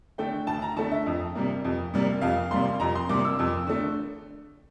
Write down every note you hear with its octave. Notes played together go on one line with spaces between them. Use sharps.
D3 A3 G5
D2 A5
A#5
D3 A3 A5
E5
F2
C3 G3 A#3
F2
C3 G3 A#3
F2 F5
C3 G3 A#3 C6
F2 A#5
C6
C3 G3 A#3 D6
E6
F2
D3 A3